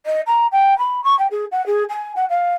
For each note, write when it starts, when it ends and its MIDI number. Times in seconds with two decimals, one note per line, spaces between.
0.06 0.21 75
0.26 0.47 82
0.52 0.76 79
0.78 1.03 83
1.04 1.17 85
1.19 1.27 79
1.31 1.45 68
1.51 1.64 78
1.66 1.83 68
1.89 2.13 80
2.16 2.25 78
2.29 2.54 77